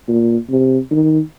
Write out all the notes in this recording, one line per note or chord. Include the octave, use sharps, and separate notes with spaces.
A#2
C3
D#3